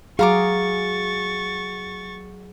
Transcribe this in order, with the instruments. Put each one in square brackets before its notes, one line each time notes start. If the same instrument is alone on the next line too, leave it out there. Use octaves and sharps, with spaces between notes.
[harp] F#3 [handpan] G#4 [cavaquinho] F5 A#5 D6 [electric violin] C#6 A6